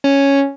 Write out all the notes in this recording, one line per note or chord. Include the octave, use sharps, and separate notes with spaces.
C#4